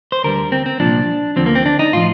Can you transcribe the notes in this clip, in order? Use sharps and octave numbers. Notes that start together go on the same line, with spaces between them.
C5
D2 D3 G3 A#4
C4
C4
C2 A#2 F3 D4
D2 D3 F3 C4
A#3
C4
D4
D#4
A2 F3 F4